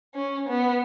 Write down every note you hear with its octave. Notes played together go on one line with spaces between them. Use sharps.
C#4
B3